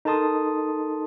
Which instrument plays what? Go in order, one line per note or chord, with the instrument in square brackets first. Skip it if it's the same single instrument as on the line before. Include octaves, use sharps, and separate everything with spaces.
[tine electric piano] D#4 A4 A#4 A5 C6 D#6